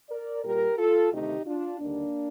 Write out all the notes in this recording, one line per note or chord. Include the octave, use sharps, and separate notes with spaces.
A#4 D5
A#2 G3 G4 A#4
F4 A4
D2 C3 D#3 A3 D#4 G4
D4 F4
D#2 D3 G3 A#3 D4